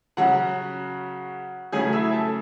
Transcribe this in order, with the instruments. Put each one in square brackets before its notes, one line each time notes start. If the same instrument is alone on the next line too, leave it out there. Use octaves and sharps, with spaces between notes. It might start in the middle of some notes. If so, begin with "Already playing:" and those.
[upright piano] C#3 F#3 C#4 F#4 F#5
C#3 F#3 A3 C#4 G#4 G#5
E4 E5
A4